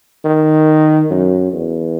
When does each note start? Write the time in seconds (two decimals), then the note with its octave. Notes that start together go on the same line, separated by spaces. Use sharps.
0.25 D#3
1.11 F#2
1.53 E2